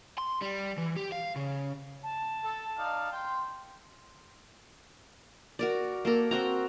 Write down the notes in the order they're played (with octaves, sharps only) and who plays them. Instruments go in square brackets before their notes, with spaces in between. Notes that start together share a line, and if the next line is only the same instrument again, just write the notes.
[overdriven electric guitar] C6
G3
E3
G4
F5
C#3
[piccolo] A5
[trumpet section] A4
D#4 D5 F5
G5 C6
[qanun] F#4 A#4 D5
A#3 A4 A#4
C4 F#4 A#5